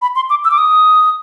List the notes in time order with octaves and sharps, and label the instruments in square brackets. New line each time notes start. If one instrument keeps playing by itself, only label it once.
[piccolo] B5
C6
D6
E6
D6
D#6